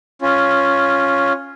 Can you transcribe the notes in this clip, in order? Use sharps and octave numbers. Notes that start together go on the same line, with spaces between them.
C#4 F4